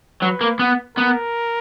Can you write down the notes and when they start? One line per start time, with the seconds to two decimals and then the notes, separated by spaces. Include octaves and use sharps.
0.22 F#3 B4
0.41 A#3
0.59 B3
0.98 B3 A#4